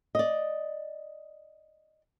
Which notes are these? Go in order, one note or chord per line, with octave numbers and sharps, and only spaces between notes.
D5 D#5